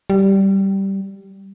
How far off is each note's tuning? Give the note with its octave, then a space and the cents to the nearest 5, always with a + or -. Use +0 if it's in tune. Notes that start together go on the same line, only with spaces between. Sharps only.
G3 -10